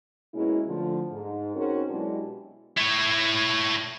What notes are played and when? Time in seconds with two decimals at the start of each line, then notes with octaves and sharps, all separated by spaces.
0.34 B2 G#3 A#3 C#4 E4
0.66 D3 F3 A3
1.10 G#2
1.55 C4 C#4 D#4 F#4 G#4 A#4
1.89 B2 F#3 G#3 D4 E4 G4
2.78 E4 C#5